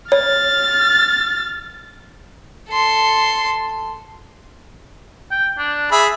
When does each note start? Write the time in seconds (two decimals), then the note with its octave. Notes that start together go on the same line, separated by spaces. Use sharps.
0.12 C#5 F6 A6
2.70 A4 C6
5.31 G5
5.58 D4
5.92 G#4 E5 B5